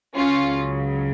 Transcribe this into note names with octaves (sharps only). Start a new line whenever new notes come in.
C#2 C#3 F#3 C#4 F4